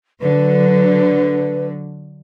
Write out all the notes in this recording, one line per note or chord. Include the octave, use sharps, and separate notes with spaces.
D3 F#3 B4